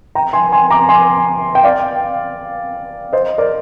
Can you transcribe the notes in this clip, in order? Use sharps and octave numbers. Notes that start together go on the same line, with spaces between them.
G5 A#5
G#5 C6
G#5 C6
A#5 D6
G#5 C6
G5
D5 F5
C5 D#5
A#4 D5